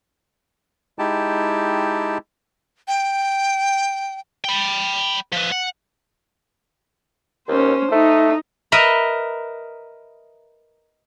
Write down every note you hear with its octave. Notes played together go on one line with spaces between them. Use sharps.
G#3 D#4 E4 G4 G5 A5
G5
G5 B5
F3 B4
F#5
D#2 C#4 C5
A3 D#4
A#4 B4 D#5 E5 A#5